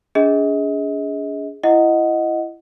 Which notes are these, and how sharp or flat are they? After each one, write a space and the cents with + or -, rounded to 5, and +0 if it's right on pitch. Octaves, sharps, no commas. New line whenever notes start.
D4 -45 G#4 +0 D#5 +35
E4 +25 D#5 +0 F#5 +0